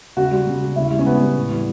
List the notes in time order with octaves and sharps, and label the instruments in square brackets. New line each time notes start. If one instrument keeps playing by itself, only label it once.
[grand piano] C#3 F#4
G3
C#3
G3
C#3 E4
G3
C#4
C#3 B3
G3
A2
E3 G3